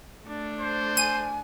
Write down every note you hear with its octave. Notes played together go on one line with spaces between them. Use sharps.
A3 D4
C5
G#5 D#7